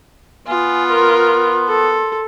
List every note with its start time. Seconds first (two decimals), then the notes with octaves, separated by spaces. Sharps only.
0.47 B3 F4 G#5
0.89 A#4 C6
1.68 A4